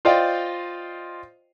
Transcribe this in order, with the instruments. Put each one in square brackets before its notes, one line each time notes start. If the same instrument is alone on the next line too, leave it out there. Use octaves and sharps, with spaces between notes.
[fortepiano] F4 C5 D5 D#5 F5 G5